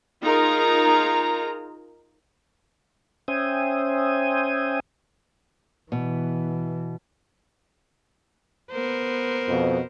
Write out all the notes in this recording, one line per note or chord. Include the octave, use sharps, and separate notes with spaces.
D#4 F4 G#4 A#4 A#5
C#4 C5 E5 G5 G#5 D#6
B2 E3
B3 A#4 C5
F2 B2 F3